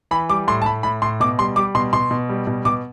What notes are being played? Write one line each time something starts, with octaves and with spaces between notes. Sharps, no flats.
E3 B5
G3 D6
A2 C6
A5
A2 B5
A2 B5
A2 C6
B2 D6
G3 C6
G3 D6
B2 C6
B2 C6
B2
G3
B2
B2 D6